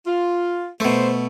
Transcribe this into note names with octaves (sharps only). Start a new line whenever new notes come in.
F4
B2 A3 C5